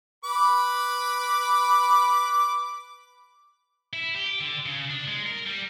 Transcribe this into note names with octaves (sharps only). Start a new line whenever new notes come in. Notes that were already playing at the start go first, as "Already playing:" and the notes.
B4 B5 D6
E4
G4
D3
C#3
D4
G#3
A#4
G3